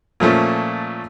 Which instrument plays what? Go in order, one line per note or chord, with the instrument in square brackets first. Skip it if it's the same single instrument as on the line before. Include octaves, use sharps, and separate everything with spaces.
[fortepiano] A#2 F3 A3 C#4